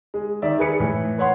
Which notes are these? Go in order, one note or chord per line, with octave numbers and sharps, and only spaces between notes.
G#3
D#3 D5 E5
G#4 B4 C#7
A2 E3
B4 C#5 F#5 C6